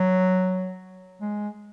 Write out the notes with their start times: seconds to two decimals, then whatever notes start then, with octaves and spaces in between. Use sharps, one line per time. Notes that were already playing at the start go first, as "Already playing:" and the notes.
Already playing: F#3
1.21 G#3